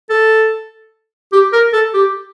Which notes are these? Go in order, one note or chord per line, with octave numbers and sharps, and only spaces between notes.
A4
G4
A#4
A4
G4